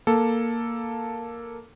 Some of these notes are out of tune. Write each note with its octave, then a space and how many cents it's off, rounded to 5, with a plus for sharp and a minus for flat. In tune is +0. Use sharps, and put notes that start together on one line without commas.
A#3 +0 A4 +0